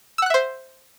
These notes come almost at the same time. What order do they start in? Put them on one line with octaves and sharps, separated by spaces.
E6 F#5 F#6 E5 C5